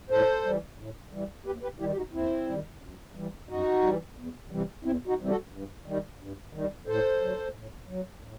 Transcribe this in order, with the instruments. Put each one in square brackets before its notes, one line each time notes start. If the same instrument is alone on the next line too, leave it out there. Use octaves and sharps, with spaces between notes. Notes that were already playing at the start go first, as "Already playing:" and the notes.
[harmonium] A2 A4 C5
E3 G3
A2
E3 G3
D#2 G4 B4
G4 B4
D#3 G3 E4 G4
G4
D#4 F#4
D#2 C4 E4
D#3 G3
F#2
E3 G3
F#2 D#4 F#4
E3 G3
E2
C3 E3 G3
E2 C4 E4
D#4 F#4
C3 E3 G3
F#4 A4
G2
D#3 G3
G2
D#3 G3
A2 A4 C5
F#3
A2
F#3
A2